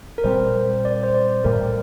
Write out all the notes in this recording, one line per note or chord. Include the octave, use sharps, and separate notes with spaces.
A#4
A#2 G3 C4 C5
D5
C5
D5
A2 G3 A#3 A#4